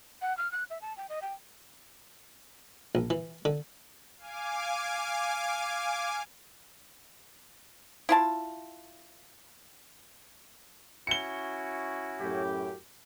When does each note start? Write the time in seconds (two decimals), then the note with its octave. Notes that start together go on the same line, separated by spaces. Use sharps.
0.21 F#5
0.37 F6
0.52 F#6
0.70 E5
0.81 A5
0.97 G5
1.09 D#5
1.22 G5
2.95 A#1
3.10 E3
3.45 D3
4.18 F5 G#5 D6
8.09 E4 F4 A5
11.07 C#4 E4 F#4 C#7 G7
12.20 F#2 A2 G4